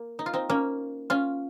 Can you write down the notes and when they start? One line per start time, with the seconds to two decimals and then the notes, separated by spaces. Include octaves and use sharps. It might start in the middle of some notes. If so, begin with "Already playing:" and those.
Already playing: A#3
0.19 D#4
0.26 F4
0.33 C4 D#4
0.50 A#3 C#4
1.10 C#4 F4